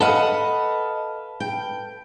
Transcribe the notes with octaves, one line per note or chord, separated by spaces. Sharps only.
A4 B4 D#5 F5 F#5
G5